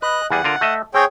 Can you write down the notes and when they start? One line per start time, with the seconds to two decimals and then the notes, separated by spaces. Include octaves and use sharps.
0.02 B4 D#5 F#6
0.30 E2 G3 G#4 F#5
0.44 D3 F4 A#4
0.61 A3 D#5 E5
0.94 C4 G#4 C#5 G5